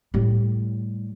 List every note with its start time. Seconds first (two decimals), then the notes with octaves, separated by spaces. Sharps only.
0.14 A2 G3